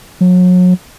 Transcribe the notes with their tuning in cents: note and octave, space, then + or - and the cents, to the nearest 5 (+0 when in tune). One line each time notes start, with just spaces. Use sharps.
F#3 -35